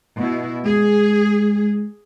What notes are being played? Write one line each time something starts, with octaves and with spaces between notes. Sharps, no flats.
B2 E4
G#3 G#4